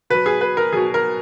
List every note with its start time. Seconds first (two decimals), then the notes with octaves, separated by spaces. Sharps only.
0.10 B2 F#3 B4
0.26 G#4
0.41 B4
0.57 A#4
0.73 B2 F#3 G#4
0.94 A#4